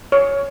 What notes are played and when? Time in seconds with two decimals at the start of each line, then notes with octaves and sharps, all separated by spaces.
0.12 C#5